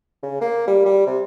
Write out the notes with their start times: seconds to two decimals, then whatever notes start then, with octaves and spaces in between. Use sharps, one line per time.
0.23 C#3
0.41 A#3
0.67 G3
0.86 G3
1.07 C3